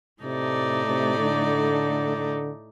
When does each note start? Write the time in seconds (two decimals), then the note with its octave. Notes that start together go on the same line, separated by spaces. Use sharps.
0.23 A2 C3 A3 D#4 A4 D5
0.87 C3
1.20 D3
2.17 D3